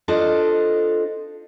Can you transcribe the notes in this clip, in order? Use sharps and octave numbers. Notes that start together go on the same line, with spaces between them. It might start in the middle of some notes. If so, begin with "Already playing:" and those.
D4 F4 A4 C5 D#5